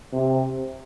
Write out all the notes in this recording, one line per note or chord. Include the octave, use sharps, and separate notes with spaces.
C3